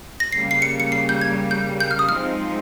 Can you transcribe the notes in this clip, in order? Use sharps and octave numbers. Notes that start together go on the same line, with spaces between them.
A#6
C#3 G3 A#3 C7
C7
C#7
C#7
C7
G6
G#6
G6
G6
F6
D#6
F3 G#3 C4 D#4 F6